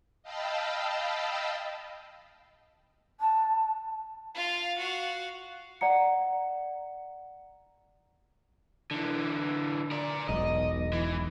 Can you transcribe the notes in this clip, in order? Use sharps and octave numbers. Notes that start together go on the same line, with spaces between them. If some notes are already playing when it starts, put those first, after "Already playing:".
D#5 F5 G5 A5 B5 E6
A5
F4 F5
F#4 F5
D5 F#5 A#5 C#7
D3 E3
A#4 D5
E1 B1 D#5
E3